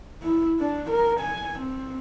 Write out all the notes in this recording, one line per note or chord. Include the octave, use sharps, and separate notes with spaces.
E4
D4
A#4
G#5
C4